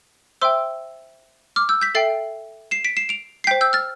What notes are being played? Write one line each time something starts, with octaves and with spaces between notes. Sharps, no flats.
C5 E5 G5 C6 E6
D6 F6
E6 G6
G6 B6
A4 E5 G5 A6 C7
C7 E7
B6 D7
C7 E7
D7 F7
C7
C5 G5 G6 B6
E6 G6
F6 A6